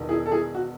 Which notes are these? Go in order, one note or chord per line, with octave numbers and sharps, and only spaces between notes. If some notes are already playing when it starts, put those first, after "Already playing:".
Already playing: E1 E2 D#3
E4 G#4
A4
E4 G#4
F#4